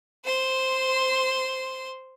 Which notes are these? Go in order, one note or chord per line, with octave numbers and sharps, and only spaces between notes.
C5 C6